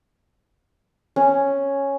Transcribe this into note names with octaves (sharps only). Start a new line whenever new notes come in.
C#4